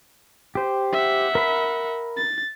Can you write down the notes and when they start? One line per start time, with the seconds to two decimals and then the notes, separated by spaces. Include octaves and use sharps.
0.55 G4 C5
0.93 E5 F#5
1.35 A#4 B5
2.17 A6